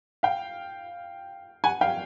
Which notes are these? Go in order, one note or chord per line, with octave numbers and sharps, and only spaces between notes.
F5 G5
F#5 G#5
F5 G5